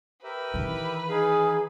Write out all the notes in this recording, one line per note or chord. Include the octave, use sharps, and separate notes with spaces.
G4 A#4 B4 E5
D#3 E3
D#4 G#4 F5